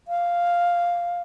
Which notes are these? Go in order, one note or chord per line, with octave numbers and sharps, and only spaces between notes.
F5